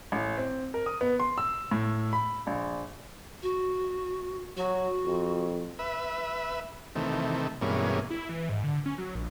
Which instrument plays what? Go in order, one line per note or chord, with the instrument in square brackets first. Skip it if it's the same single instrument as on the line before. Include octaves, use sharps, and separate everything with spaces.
[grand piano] A1
C4
A#4
D#6
B3
C6
E6
A2
B5
A#1
[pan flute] F#4
[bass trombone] F#3 [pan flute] F#4
[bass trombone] F2
[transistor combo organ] B4 E5
C3 D#3 E3 A3
G2 B2 E3 G#3 A#3 C#4
[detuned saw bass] E4
E3
G#2
D3
C#4
F#3
A#1